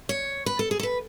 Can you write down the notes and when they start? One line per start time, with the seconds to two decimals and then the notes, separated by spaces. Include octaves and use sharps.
0.09 C#5
0.46 B4
0.59 A4
0.71 G#4
0.79 A4
0.83 B4